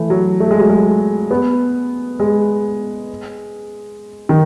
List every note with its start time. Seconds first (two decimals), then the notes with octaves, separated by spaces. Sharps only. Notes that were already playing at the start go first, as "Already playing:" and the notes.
Already playing: E3 A3
0.10 F#3
0.40 A3
0.51 G#3
0.60 F#3
0.70 G#3
1.31 B3
2.20 G#3
4.29 D#3